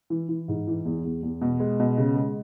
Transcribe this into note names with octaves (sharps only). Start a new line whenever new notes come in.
E3
E3
G#2
E3
E2
E2
E2
B2
G#3
B2
C#3
G#3